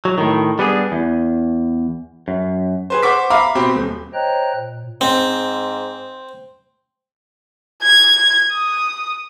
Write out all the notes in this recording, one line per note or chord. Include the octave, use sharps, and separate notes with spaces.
F#3
A2 D#3
G3 B3 D4 G#4
E2
F#2
G#4 B4 C5
C5 F#5 C#6 D6 B6
E5 F5 A#5 B5 D6
B2 C4 G4 B5
D#1
C5 C#5 D#5 G5 A#5 F#6
A#2
G#2 C4
G#6
D#6